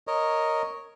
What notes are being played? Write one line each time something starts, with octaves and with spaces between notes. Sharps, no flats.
A#4 C#5 D#5